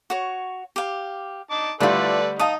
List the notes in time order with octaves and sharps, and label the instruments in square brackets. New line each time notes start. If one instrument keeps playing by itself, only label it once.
[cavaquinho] F#4 C#5
G4 F5
[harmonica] D#4 A5 D6
[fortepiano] D3 G3 A3 [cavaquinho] E4 F4 [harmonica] A4 B4 D5
[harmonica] D#4 [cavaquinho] F5 A5 D#6